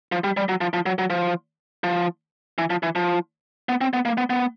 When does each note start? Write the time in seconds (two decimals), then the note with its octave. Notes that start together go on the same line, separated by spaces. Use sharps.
0.12 F3
0.24 G3
0.37 G3
0.49 F#3
0.61 F3
0.74 F3
0.86 F#3
0.99 F#3
1.10 F3
1.84 F3
2.58 E3
2.70 F3
2.83 E3
2.96 F3
3.69 B3
3.81 C4
3.93 B3
4.05 A#3
4.18 B3
4.30 B3